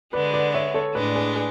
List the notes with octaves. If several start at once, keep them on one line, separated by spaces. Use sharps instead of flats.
D3 G#3 B3 B4 D5
B4 D5
C#5 E5
A4 C#5
A2 G#3 D4 B4 D5
G#4 B4
G#4 B4